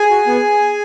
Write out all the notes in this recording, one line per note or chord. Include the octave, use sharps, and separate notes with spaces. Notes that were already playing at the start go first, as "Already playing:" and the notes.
Already playing: G#4 G#5
F#4
B3